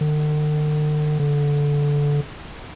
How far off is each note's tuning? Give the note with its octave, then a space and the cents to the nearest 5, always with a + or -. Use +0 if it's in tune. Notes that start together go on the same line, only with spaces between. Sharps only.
D3 +45
D3 -15